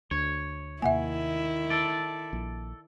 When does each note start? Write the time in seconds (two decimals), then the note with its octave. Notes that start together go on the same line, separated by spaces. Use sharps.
0.11 D2 C#5
0.82 D#2 C3 D#3 A#3 E4 E5 F#5 G#5
1.70 A4 D5
2.33 A#1